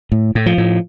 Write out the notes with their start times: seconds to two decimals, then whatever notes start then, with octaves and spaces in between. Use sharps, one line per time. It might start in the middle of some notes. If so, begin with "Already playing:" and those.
0.12 A2
0.35 A2
0.46 F3
0.58 A2